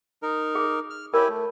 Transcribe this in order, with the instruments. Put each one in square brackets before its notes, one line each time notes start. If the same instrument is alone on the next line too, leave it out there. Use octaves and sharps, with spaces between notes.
[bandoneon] D#4 A#4
[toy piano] G#4
[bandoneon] F6
[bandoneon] E4 G4 G#5 [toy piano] A#4 C#5
[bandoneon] A3